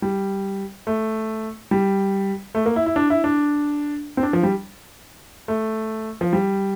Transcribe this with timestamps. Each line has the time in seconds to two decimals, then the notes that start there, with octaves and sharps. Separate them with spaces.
0.02 G3
0.87 A3
1.71 G3
2.55 A3
2.66 A#3
2.76 E4
2.86 E4
2.96 D4
3.10 E4
3.24 D4
4.17 C4
4.23 D4
4.33 F3
4.43 G3
5.48 A3
6.21 F3
6.33 G3